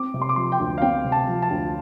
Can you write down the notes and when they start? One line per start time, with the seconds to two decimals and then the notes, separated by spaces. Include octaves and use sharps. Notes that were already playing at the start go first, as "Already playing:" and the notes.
Already playing: C4 D6
0.14 C3
0.22 C6
0.29 D6
0.36 F3 C6
0.52 G5
0.59 D2
0.78 F5
0.82 C4 G5
1.04 C3
1.12 A5
1.28 F3
1.42 A5
1.50 D2